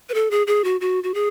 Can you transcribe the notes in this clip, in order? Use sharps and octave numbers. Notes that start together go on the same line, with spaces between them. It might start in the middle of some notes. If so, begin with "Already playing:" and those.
B4
A4
G#4
G#4
F#4
F#4
F#4
G#4